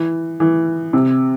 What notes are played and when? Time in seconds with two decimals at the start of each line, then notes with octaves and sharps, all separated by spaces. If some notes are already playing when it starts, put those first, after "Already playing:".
Already playing: E3
0.40 E3
0.93 C3